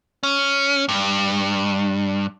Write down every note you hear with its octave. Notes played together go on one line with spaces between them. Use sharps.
C#4
G2